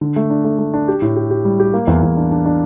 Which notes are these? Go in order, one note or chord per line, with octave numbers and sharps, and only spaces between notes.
D3
A3
D4
A3
A3
D4
G4
A2
G4
G4
G3
G4
A#3
E2
E2
D4
D4
D4